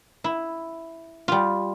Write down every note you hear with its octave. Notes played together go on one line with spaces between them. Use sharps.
E4
G3 F4